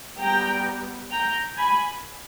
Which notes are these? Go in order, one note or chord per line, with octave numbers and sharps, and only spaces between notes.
G3 B3 G5 A#5
G5 A#5
G#5 B5